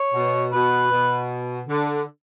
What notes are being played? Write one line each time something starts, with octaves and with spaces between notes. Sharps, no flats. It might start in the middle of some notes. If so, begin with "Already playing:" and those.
Already playing: C#5
B2
B2 B4
B2
D3